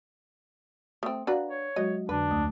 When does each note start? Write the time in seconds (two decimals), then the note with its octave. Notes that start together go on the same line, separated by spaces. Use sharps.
1.03 A3 C4 D#6
1.27 D4 F#4 B4 F5 A#5
1.49 C#5
1.76 F#3 G#3 F#4 D#5
2.09 F2 D3 D4 B4
2.31 D2 A3 D#6